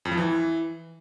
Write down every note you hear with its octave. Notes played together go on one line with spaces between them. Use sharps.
F2
F3
E3